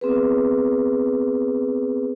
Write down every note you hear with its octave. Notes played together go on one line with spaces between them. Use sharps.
B3 C4 G#4 B4